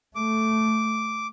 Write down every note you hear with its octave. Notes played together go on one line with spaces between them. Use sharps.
A3 D6